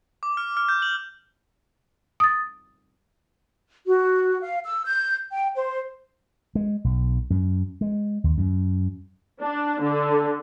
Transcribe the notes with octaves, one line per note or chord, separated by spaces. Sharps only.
D6
F6
F6
G6
F#7
D#6 A6
F#4
F5
E6
G6
G5
C5
G#3
B1
F#2
G#3
D#2
F#2
D4
D3